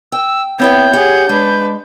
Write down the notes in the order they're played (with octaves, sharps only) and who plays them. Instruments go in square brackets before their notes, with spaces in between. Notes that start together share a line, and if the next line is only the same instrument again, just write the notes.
[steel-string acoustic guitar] G5 [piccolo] E6
[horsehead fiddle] B3 [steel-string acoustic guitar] C4 E4 G5 [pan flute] C#5 [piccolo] G6
[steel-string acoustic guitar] G4 [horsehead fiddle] G#4 F#5
[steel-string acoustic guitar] G#3 [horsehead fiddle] D4 B4